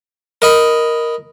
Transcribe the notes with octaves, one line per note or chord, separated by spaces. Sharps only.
A#4 D#5 B5